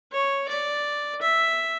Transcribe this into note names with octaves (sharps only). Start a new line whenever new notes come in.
C#5
D5
E5